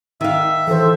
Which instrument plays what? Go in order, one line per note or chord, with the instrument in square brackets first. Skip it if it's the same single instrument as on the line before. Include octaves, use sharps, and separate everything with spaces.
[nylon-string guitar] D#3 F5 [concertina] E5
[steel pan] E3 C5 [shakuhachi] A4